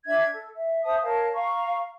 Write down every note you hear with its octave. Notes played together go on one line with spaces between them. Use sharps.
D4 E5 G#6
A4
E5
C5 E5 A5 D#6
A#4 C#5 F5 A5
F5 A#5 C#6